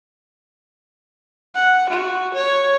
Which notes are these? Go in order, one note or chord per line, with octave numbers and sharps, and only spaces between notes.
F#5
F#4
C#5